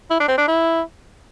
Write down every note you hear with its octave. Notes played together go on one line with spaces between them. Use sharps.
E4
D4
C4
D4
E4